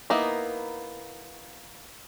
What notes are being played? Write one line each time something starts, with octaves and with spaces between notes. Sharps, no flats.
A#3 B3 D#4 E4